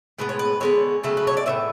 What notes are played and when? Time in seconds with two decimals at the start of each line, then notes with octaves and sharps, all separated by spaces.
0.18 A2 G#3 B3 B4
0.29 C#5
0.39 B4
0.60 D3 G#3 B3 C#5
1.04 C#3 F#3 A3
1.17 B4
1.27 C#5
1.37 D5
1.46 A2 E3 B3 E5